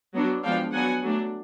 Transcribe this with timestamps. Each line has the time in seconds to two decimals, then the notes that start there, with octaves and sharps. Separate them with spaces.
0.14 F#3 B3 D4
0.43 F3 G#3 B3 D4 F5 G5
0.72 F#3 B3 D4 F#5 G#5
1.02 F#3 A3 D4